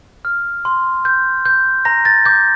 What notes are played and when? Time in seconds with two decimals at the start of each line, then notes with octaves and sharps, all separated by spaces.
0.25 F6
0.65 C6
1.05 G6
1.45 G6
1.85 A#5 A#6
2.05 A6
2.26 D6 G6